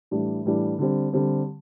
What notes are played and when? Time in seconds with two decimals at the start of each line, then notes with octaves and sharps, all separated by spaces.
0.11 A2 E3 G3 D4
0.45 A2 E3 G3 D4
0.79 D3 G3 C4
1.13 D3 G3 C4